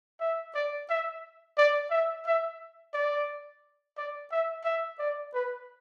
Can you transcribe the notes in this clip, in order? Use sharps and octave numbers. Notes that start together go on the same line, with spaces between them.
E5
D5
E5
D5
E5
E5
D5
D5
E5
E5
D5
B4